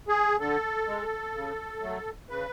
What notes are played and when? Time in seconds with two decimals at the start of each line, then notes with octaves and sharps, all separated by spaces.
0.08 G#4
0.40 D3 A4
0.88 G#3
1.35 C#3
1.82 F#3 A3
2.29 C#3 B4